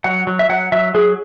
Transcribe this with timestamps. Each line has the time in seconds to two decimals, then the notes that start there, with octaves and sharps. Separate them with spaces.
0.04 F#3 F#5
0.27 F#3
0.39 E5
0.49 F#3 F#5
0.72 F#3 E5
0.94 F#3 G#4